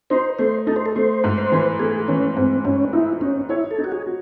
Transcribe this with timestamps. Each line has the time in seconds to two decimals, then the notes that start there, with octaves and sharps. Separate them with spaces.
0.10 D#4 C5
0.39 A3 C5
0.67 D#4 A4
0.76 C5
0.86 A4
0.96 A3 C5
1.24 G#2
1.38 C5
1.52 E3
1.79 A3 G#4
2.08 E3 C#4
2.36 G#2 C4
2.65 G#2 C#4
2.93 D#4 E4
3.21 C#4 D#4
3.49 E4 C#5
3.71 A4
3.78 D#4
3.84 F#4
3.92 G#4
4.06 F#4